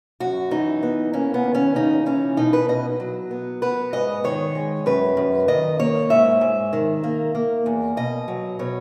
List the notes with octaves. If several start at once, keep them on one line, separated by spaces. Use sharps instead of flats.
F#2 F#4
E3 D#4
B3
A#3 C#4
B3
D#2
C#4
C#3 D#4
E3 C#4
B2 D#4
B4
B2 D#5
F#3
B3
B3 B4
G#2 D#5
D#3 C#5
G#3
F#2 B4
F#2
D#3 D#5
A#3 C#5
G#2 E5
G#2
D#3
A#3
A#3
E2
B2 D#5
F#3
B2 C#5